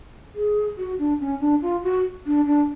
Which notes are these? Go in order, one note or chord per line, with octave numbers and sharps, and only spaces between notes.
G#4
F#4
D4
C#4
D4
F4
F#4
D4
D4